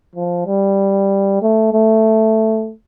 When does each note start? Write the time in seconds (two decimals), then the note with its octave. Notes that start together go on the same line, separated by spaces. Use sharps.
0.15 F3
0.47 G3
1.42 A3
1.73 A3